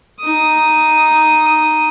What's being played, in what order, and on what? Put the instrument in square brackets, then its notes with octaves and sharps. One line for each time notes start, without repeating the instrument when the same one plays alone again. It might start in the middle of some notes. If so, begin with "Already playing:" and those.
[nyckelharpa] D#4 D#6